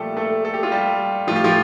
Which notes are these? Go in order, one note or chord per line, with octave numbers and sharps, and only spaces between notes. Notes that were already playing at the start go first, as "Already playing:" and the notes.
Already playing: A#2 F3 G3 A3 G4 A4
A3 A4
A4
G4
F4
G3 G4
A2 F3 F4
G4
F3 F4